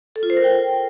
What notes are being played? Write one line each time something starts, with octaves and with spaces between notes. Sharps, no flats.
A4
F4
C5
A#4
G5